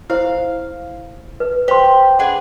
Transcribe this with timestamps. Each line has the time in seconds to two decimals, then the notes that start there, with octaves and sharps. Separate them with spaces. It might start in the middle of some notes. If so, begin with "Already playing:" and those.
0.10 E4 C5 F5
1.40 B4
1.68 G4 C5 C6
2.19 D4 G#4 B4 F#5